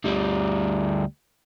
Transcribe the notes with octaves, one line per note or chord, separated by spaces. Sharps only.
D2 G3